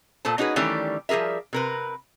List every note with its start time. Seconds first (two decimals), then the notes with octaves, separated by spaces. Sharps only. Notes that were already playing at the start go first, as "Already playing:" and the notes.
0.25 A#2 A4 C5 A5
0.38 C#4 D#4 F#4 G#4 B4
0.56 D#3 E3 G3 A3 C#4 G4
1.09 F3 G3 G#4 A#4 E5
1.53 C3 A#4 B4